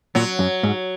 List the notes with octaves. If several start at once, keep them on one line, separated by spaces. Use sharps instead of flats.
A#2 F#3
F#2
G#2